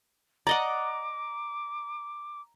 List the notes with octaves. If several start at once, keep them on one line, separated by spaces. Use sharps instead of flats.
D5 D#5 F#5 A#5 D6